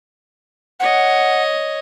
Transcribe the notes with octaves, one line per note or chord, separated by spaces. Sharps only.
C#5 D#5 F#5